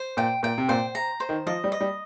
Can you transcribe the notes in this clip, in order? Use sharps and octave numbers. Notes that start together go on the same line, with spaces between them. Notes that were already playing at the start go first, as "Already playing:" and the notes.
Already playing: C5
A#2 G5
A#2 G5
C3
A#2 C5
A#5
C5
D#3
F3 D#5
G3
D#5
G3